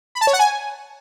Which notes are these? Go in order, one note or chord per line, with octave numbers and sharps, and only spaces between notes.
B5
A5
C#5
F#5
G#5